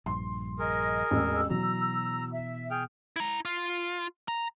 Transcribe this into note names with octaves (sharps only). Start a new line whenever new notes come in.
A#1 G2 C6
G#4 A#4 D#5
E1 A1 E6
B2 E3 F#3 A#5
E5
G#4 G5 F6
E4 A#5
F4
A#5